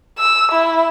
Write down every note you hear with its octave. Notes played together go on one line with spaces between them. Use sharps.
E6
E4